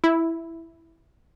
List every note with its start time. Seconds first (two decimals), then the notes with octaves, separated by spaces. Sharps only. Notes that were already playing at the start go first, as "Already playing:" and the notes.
0.04 E4